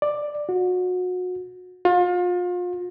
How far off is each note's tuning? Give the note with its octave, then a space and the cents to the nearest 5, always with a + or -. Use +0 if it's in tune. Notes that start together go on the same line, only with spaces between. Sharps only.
D5 +5
F#4 -30
F4 +35